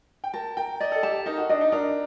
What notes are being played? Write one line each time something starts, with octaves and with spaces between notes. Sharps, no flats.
G5
A#4 A5
A#4 G5
D5 D#5
A4
G4 A5
D#4 A#4
F#4
D4 D#5
D#4
D4 A#4